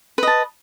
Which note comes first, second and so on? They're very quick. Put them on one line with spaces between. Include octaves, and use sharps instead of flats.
B4 D#5 A5